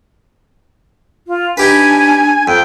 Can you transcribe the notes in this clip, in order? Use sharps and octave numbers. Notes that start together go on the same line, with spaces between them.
F4
D4 D#4 G4 B4 G#5
F2 G5